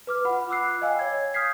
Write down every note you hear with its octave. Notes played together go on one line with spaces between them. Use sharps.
B4 D6 F6
F4 F#5 B5
B5 D6 E6 F#6 C7
D#5 F5 G5 G#5 E6
C#5 G#6
D#6 F6 G6 G#6 B6 C7